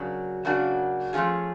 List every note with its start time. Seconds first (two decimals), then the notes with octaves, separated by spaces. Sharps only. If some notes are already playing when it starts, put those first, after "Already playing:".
Already playing: C#3 F#3 A#3 D4 F#4
0.45 C#3 F#3 A#3 D4 F#4
1.13 F3 A3 C#4 F4 G#4